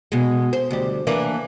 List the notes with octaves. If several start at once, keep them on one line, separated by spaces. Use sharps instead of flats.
B2 G#3
C5
D2 G3
E3 A#3 D4